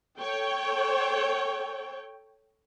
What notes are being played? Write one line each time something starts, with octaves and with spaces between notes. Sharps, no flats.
A4 C#5 G5